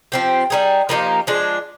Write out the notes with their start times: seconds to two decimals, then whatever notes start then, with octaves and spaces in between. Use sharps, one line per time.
0.12 F3 C4 G4
0.50 G3 A#3 D#4 G#4
0.89 F3 A#3 D#4 G4
1.27 F3 G#3 D4